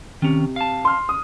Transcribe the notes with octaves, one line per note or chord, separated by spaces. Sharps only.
C3 D#3 C#4
F5 A5
C6 F6
D#6